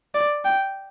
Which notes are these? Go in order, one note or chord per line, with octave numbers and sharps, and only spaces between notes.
D5
G5